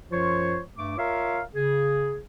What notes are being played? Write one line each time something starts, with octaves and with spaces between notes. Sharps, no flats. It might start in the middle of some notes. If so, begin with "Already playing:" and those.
F#2 F3 F4 C5 C#5 C#6
G2 A3 D6
F4 A#4 C#5 E5 F5
C#3 G#4